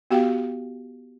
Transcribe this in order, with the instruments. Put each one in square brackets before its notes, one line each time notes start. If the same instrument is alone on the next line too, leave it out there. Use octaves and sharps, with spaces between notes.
[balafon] B3 F#4 G4 F5 G5